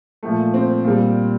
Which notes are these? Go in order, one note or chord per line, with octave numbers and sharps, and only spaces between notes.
A#2 F3 A3
C4
A#2 G3